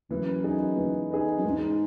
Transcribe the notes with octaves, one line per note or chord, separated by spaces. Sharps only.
F#2 E3
B3 D#4 G#4
E3
B3 D#4 G#4
F#2
G#2 G#3